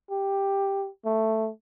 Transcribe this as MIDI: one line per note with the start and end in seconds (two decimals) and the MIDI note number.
0.11 0.88 67
1.05 1.49 57